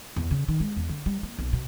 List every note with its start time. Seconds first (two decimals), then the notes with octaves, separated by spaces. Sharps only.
0.16 E2
0.31 C#3
0.49 D#3
0.60 G#3
0.76 E2
0.89 D3
1.06 G3
1.23 A#3
1.39 B1
1.53 B2